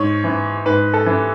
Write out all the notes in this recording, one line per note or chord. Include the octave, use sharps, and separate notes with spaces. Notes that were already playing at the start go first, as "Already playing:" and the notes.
Already playing: G#2 C#5
E3
G#2 B4
A4
E3